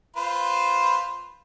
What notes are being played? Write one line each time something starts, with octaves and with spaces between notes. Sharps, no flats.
F4 B4 C5